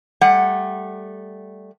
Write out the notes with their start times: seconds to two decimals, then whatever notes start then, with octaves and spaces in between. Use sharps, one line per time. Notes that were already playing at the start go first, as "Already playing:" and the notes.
0.21 G3 A3 F#5